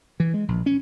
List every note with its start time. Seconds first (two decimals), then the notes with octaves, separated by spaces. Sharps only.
0.20 E3
0.34 G#3
0.48 A#1
0.66 C#4